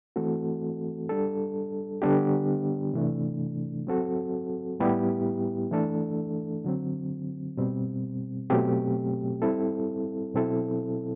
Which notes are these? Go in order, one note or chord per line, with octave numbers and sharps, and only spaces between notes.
E3 A3 C4 F#4 A4
G3 D4 A4
D3 G3 B3 D4 G4
C3 E3 A3 D4
F#3 C4 F#4 A4
A2 G3 B3 E4 G4
E3 A3 D4 A4
D3 F#3 C4
B2 G3 C4
B2 F#3 A3 C4 G4
G3 C4 E4 A4
B2 F#3 C4 E4 A4